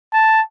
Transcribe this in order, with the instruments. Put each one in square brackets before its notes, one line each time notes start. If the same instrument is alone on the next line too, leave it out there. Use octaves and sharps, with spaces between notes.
[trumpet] A5